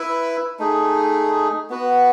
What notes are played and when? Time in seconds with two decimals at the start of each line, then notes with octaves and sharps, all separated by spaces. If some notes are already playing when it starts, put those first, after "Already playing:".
Already playing: E4 B4 E5
0.59 A3 D#4 G#4
1.70 B3 F#4 B4